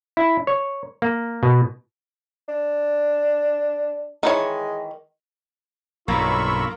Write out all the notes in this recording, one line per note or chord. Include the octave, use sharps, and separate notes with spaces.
E4
C#5
A#3
B2
D4
D#3 E3 G#3 C#5
B1 G2 A#3 F4 B5 C#6 E6